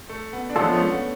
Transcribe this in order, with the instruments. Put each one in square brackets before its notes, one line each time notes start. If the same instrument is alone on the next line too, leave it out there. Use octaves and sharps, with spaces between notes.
[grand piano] A3
B3
D4
[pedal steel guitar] F3 G#3 B3 F4 A4 [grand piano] A3 C#4
[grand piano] A3 C#4
B3